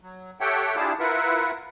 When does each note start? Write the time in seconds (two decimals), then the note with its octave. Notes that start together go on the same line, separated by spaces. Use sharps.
0.01 F#3
0.41 G4 A4 C#5 E5 F#5 G5
0.76 D4 E4 F4 G4 G#4 A5
1.00 E4 F4 A#4 B4 E5 F#5